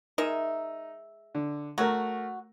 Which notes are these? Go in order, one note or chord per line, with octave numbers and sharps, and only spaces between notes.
G#3 D#4 A#4 E5
D3
F#3 A3 F#4 A#4